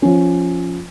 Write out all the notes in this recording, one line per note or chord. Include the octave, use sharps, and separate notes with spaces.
F3 C#4